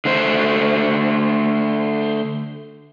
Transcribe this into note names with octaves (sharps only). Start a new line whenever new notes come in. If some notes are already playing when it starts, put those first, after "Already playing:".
D3 A3 C5